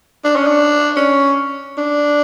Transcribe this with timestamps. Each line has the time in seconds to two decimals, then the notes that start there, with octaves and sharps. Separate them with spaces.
0.25 D4
0.36 C#4
0.47 D4
0.96 C#4
1.78 D4